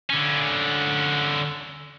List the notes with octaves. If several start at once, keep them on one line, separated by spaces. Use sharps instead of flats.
D3 C#4